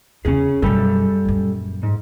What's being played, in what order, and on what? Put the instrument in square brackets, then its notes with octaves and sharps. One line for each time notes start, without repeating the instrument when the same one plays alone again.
[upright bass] E2 C#3 [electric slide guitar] C#4 G#4
[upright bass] F#2 B2 [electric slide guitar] G3 A4
[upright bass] A#1 F#2
[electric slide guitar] G#2